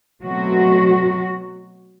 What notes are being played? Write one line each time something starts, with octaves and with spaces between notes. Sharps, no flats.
B2 F#3 A3 C4 F#4